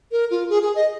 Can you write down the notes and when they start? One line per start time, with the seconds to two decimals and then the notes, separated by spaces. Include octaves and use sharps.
0.12 A#4
0.31 F4
0.50 G#4
0.63 G#4
0.75 D#5